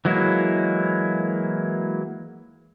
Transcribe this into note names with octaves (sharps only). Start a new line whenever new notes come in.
E3 F#3 G#3 A#3 E4